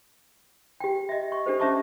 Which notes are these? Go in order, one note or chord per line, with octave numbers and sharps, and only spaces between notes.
G4 G5
D#5 E5
C#6
D4 G4 A4 C5
C#4 D4 E5 A5 C#6 D6